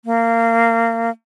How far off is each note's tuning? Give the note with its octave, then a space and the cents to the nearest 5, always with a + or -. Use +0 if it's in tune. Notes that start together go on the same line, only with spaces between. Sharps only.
A#3 -25